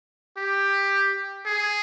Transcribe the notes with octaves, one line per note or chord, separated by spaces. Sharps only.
G4
G#4